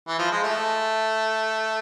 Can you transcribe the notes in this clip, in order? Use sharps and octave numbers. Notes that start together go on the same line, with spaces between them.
E3
F3
G#3
A3